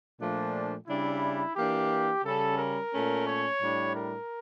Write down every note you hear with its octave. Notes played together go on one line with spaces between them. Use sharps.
A#2 F3 A3 D4
C#3 G3 D4 E4
E3 A#3 D4 G4
C#3 G3 C#4 A4
A#4
A#2 A3 C#4
C#5
A2 G3 D4
A#4